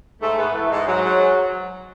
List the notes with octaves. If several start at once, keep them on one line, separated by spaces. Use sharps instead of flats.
G#2 A3
G#2 B3
E3 A3
G#2 G#3
G#2 F#3
G#2